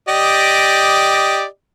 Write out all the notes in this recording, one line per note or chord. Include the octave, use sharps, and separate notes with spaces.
G4 D5 D#5